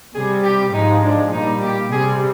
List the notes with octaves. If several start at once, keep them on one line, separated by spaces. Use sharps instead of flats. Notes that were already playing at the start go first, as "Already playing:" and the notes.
C3 G3 G#4
G4
G#2 F3 G#3 D#4
D4
A#2 G3 D#4
G4
C3 G3 G#4